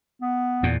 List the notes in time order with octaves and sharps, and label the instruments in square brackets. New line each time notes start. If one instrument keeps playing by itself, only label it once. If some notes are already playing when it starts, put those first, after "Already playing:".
[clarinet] B3
[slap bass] E2 A#2